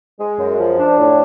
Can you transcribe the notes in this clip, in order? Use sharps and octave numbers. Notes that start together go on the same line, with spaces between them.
G#3
F#2
F3
D4
A2